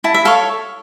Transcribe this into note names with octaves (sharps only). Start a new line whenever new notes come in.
E4 A5
E5
A4 C#5 F5